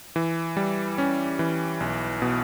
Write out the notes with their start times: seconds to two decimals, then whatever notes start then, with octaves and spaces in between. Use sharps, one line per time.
0.16 E3
0.57 G3
0.98 C#4
1.39 E3
1.80 B1
2.22 B2